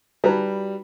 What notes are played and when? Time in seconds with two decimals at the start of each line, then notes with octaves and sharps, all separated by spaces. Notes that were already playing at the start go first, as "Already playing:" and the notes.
0.24 G3 D#4 F#4 B4 A#5